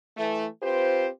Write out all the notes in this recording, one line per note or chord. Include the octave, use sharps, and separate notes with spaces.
E3 A3
C4 F4 G4 B4 C5